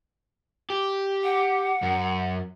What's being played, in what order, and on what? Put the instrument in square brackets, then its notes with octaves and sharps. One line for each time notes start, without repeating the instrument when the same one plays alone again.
[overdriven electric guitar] G4
[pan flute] F#5
[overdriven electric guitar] F#2